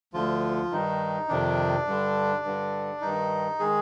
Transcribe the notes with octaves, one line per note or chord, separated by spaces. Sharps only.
D2 D3 F3 F4
G2 D#3 D#4
F2 C3 D#3 D4
G2 D3
G2 D3
G2 D#3 D#4
D#3 G#3 G#4